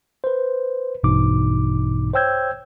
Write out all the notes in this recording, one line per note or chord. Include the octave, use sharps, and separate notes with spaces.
B4 C5
A#1 G2 B2 E3 D#4 D6
C5 C#5 G5 E6 G6 G#6